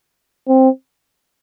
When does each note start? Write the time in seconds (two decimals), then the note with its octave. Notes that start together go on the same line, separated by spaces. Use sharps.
0.48 C4